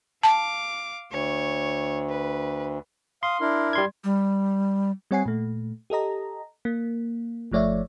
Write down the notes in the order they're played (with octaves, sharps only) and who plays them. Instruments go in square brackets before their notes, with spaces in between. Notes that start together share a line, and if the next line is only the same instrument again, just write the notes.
[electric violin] F5 D6 [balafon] A5
[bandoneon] D2 [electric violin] C#5
[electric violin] B4
[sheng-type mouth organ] F5 D#6 [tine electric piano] C6
[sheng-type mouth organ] D4 E4 A#4
[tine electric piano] G3 C6 G#6
[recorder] G3
[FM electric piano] G3 C4 C#5 F#5 G#5 C7
A#2 A3
G4 A4 D#5 A#5
A#3
G1 F3 A3 C#5 D5 E5